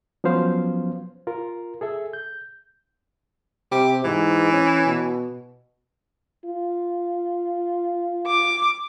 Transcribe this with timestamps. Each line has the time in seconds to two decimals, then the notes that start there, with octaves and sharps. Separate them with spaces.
0.24 F3 F#3 B3 C#4 C5 F5
1.27 F4 A#4
1.81 G#4 A4 E5
2.13 G6
3.72 C3 G4
4.04 G#2 E3
4.53 C#4
4.87 B2
6.45 F4
8.26 D6